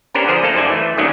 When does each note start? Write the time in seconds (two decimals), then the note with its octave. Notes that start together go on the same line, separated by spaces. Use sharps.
0.14 B3 C#4 D4 G4 A#4 C5
0.27 D3 F3 G#4 A#4 C5
0.42 A3 A#3 A4
0.54 F#2 D#4 C5 D5 G#5
0.69 E3 A3
0.97 D#2 D#3 F#3 A3 C#4 D4